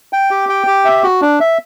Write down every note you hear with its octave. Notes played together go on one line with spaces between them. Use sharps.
G5
G4
G5
G4
E5
F#4
D4
E5